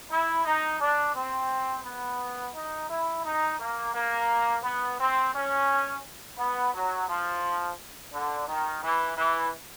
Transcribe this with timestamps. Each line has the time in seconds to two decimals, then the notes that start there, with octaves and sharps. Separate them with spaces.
0.10 E4
0.45 D#4
0.80 D4
1.14 C4
1.84 B3
2.55 D#4
2.89 E4
3.24 D#4
3.59 A#3
3.94 A#3
4.64 B3
4.99 C4
5.34 C#4
6.38 B3
6.74 F#3
7.08 F3
8.13 D3
8.48 D#3
8.82 E3
9.17 E3